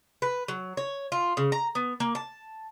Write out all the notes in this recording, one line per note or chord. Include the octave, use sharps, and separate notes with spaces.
B4
F#3
C#5
F4
C#3
A#5
B3
A#3
A5